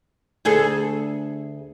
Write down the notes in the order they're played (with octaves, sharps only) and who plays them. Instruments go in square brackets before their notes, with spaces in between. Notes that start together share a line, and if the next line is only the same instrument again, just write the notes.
[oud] D2 G#4 A4